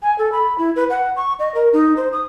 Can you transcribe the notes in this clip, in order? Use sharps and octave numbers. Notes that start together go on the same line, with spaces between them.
G#5
A4
B5
E4
B4
F#5
C#6
D#5
A#4
D#4
C5
D#6